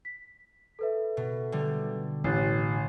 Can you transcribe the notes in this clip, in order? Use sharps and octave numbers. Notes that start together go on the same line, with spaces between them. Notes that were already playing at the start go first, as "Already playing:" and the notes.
B6
A4 B4 E5
B2
D3 G3
A1 F#6 A6 C7